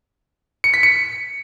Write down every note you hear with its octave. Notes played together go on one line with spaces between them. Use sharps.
C#7
B6
C#7